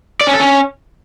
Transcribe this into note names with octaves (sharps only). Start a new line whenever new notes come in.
D5
C#4
A4
C#4